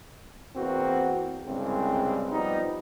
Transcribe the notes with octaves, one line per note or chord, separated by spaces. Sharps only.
E2 A#3 C4 F#4
C2 G2 C#3 G#3 C4
F3 G3 B3 D#4